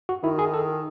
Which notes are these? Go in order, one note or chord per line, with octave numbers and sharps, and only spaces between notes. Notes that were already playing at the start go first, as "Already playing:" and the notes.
F#4
D#3 E4
G#4
A4